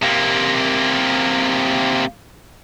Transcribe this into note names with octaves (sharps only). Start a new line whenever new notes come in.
C3 A#3